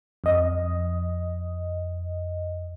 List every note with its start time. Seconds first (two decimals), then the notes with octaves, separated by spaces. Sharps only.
0.24 F2 D#5